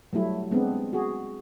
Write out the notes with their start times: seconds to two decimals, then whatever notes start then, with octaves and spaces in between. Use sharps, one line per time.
0.13 F#3 G3 A3 E4
0.51 G#3 B3 C4 D4
0.93 F#4 G#4